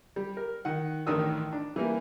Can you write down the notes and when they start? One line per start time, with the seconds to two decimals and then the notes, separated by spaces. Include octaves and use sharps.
0.16 G3
0.37 A#4
0.65 D#3 F#5
1.06 A1 D#3 D4 A#4 D#6 E6
1.53 D4
1.76 E3 G3 A#3